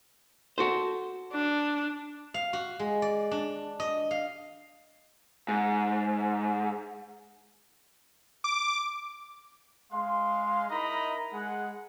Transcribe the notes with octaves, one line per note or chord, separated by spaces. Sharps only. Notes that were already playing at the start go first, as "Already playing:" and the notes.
F#4 A4 C5
D4
F5
F#4
G#3
D5
D4
D#5
F5
G#2
D6
G#3 F5 C6
D#4 E4 A#4 D#5 A#5 B5
G#3 G#4 F#5